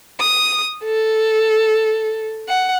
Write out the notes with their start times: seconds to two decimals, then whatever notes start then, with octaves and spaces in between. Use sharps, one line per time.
0.20 D#6
0.84 A4
2.49 F#5